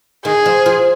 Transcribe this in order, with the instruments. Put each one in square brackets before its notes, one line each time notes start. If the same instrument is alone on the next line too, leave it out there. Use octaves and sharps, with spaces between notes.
[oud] D#3 [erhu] G#4
[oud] F3
F3